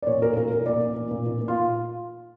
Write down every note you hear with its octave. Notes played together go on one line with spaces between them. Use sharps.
D5
A#2 C#5
A#2 A#4
A#2 A#4
A#2 A#4
A#2 D5
A#2
A#2
A#2
A#2
A#2
F4